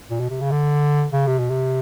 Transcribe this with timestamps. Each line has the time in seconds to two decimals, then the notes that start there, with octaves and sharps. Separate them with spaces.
0.10 A#2
0.20 B2
0.30 C3
0.41 C#3
0.51 D3
1.13 C#3
1.27 C3
1.39 B2
1.50 C3